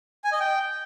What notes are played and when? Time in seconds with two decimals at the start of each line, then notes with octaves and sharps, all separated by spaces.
0.24 G#5
0.32 D#5
0.40 G5